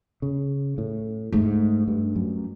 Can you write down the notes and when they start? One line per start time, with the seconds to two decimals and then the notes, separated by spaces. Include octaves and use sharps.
0.22 C#3
0.78 A2
1.32 G#2 A3
1.88 G2
2.16 F#2